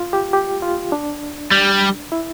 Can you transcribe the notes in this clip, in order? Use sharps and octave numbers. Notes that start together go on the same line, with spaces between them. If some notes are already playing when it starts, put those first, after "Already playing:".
Already playing: F4
G4
G4
F4
D4
G3
E4